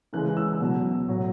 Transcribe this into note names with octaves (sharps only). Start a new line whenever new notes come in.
C#3 E3 G#3 F#6
E6
B2 F#3
A2 F#3